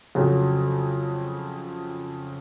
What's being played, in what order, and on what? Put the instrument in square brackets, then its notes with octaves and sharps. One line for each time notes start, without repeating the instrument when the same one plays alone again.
[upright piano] F2 C#3 F#3